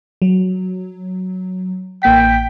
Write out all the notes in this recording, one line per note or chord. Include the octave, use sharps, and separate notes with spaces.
F#3
A1 A#3 G5 B6